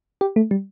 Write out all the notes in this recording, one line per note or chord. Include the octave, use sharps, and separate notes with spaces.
G4
A3
G3